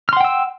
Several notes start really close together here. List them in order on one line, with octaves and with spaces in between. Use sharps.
F6 C6 F#5 G5 E6